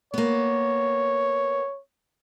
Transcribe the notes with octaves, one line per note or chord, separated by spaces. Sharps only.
A#3 B3 C#5